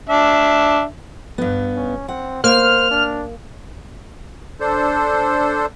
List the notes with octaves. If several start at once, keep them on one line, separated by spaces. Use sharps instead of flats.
D4 E5
G2 B3
C#4
C4 F#5
A#3 C5 F6
D4
D4 A4 C5